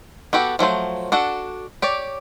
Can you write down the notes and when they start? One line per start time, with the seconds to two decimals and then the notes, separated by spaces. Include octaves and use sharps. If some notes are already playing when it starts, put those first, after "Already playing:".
0.33 B3 F#4 G4 A4
0.59 F3 F#3 A3 C5
1.12 D4 F#4 A4 F#5
1.82 G4 C#5 D5